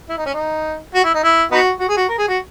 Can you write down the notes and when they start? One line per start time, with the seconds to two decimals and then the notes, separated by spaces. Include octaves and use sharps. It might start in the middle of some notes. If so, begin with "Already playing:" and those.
0.09 E4
0.18 D#4
0.26 C#4
0.34 D#4
0.94 F#4
1.04 E4
1.14 D#4
1.24 E4
1.52 B3 D#4 F#4
1.80 F#4
1.89 G#4
1.97 F#4
2.09 A#4
2.19 G#4
2.28 F#4